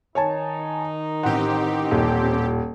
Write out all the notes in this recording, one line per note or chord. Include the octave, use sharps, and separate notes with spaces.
D#3 D#4 C#5 G#5 A5
A1 C4 G4 F#5
D#1